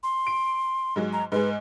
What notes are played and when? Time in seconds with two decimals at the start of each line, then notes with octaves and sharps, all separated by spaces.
0.03 C6
0.27 D7
0.96 G#2 F#3 G#3
1.13 A#5
1.32 G#2 G#3 B4